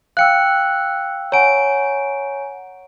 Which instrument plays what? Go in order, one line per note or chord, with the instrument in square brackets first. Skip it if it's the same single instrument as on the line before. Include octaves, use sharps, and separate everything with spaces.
[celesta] F5 G5 E6 [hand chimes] F#6 C#7
[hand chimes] C#5 D7 [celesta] F#5 G#5 A#5